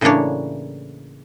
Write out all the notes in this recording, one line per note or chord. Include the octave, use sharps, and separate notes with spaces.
A2 C#3 E3 A#3 D4 C#5